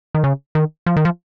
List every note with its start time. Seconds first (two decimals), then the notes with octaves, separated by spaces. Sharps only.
0.15 D#3
0.24 C#3
0.55 D#3
0.86 F3
0.96 D#3
1.05 F3